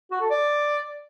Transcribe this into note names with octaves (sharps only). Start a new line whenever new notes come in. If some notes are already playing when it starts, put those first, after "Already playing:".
F#4
A4
D5